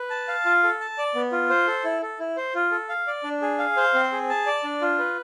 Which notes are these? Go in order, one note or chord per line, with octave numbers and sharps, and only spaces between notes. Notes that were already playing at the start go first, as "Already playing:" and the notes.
Already playing: B4
A5
F5
F4
A4
A5
D5
B3
F4
C5
A4
E4
A4
E4
C5
F4
A4
F5
D5
D4
G#4
F5
C5
C4
G#4
A5
D5
D4
F4
B4